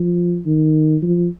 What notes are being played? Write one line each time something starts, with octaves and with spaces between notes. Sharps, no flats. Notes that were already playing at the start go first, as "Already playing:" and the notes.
Already playing: F3
D#3
F3